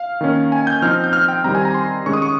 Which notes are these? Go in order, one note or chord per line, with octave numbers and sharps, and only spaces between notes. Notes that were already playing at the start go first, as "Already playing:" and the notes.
Already playing: F5
D#3 A#3 C#4
G#5
G6
F3 C4 D#4 F6
G6
F6
G5
D#3 G3 C4 A#5
G#5
A#5
C6
D#3 G#3 C#4 C#6
D#6
C#6